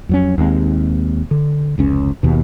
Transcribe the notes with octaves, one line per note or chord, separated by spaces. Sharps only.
F2 F#3 C#4
D#2 G#3 C4
D3
F1 C#2 C#4
D#2 B2